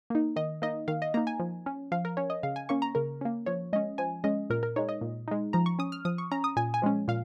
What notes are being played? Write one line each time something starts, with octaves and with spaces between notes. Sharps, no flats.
A#3 D#4
D#3 D#5
A#3 D#4 D#5
D#3 F5
D#5
A#3 D#4 A#5
G#5
F3
C#4
F3 F5
A#4
C#4 C#5
D#5
C#3 F5
G#5
A#3 C#4 C#6
A#5
C#3 A#4
A#3 C#4
F3 C#5
G#3 C#4 D#5
F3 G#5
G#3 C#4 D#5
A#2 A#4
A#4
G#3 D#4 C#5
D#5
A#2
G#3 D#4
F3 A#5
C#6
C#4 D#6
F6
F3 D#6
C#6
C#4 A#5
D#6
A#2 G#5
G#5
F3 G#3 C#4
A#2 F5